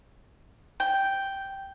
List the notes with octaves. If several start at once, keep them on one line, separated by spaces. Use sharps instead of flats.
G5